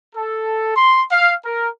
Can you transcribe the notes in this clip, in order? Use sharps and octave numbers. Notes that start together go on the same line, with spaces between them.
A4
C6
F5
A#4